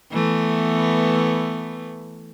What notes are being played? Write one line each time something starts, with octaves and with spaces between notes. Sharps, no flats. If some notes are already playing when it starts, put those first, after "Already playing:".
E3 A3 B3